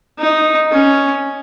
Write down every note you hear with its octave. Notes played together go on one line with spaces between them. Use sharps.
D#4
C#4